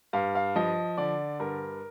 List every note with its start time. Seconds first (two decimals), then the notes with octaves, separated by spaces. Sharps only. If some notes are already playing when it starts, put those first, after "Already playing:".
0.13 G2 F5
0.35 F5
0.56 F3 D#5
0.97 D3 D5
1.40 G2 A#4